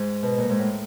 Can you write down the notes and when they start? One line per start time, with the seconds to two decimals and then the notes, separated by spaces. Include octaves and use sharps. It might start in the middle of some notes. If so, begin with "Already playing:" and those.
Already playing: G#2
0.23 B2
0.38 A#2
0.50 G#2
0.58 A2